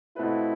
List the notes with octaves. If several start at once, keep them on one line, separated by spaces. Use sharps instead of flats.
B2 A3 C4 E4 F4 B4